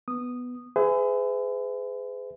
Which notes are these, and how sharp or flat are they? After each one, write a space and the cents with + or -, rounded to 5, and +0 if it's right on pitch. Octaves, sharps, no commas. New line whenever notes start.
B3 +0 D#6 -10
G#4 +0 B4 +45 E5 +0